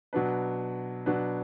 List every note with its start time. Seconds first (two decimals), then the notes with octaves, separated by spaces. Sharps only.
0.13 B2 F#3 D4 B4
1.06 B2 F#3 D4 B4